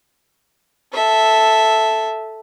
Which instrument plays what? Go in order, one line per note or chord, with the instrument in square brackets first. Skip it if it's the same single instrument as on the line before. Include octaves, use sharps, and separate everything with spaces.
[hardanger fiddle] A4 E5